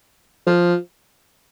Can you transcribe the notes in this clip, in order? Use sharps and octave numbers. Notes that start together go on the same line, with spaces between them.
F3